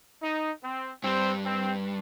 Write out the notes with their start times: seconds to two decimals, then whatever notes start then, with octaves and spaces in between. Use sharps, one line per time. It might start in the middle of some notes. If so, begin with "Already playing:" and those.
0.22 D#4
0.63 C4
1.04 G2 C4
1.45 C4